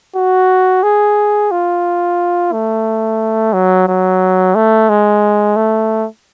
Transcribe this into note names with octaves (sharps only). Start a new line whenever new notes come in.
F#4
G#4
F4
A3
F#3
F#3
A3
G#3
A3